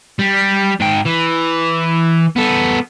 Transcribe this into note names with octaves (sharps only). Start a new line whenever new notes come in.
G3
G#2 G5
E3
B3 A4